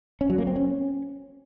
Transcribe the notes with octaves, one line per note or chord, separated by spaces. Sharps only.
C#4
F#3
A#3
C4
C#4